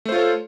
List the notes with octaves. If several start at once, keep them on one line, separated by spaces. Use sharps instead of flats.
A3 F4 A4 C5 C#5